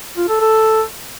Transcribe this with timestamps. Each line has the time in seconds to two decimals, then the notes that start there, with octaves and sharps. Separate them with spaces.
0.17 F4
0.29 A4
0.41 A4